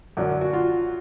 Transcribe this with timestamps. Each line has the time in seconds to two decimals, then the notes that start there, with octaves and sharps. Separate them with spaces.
0.17 F#2 D3 F#3
0.41 F#4
0.53 F4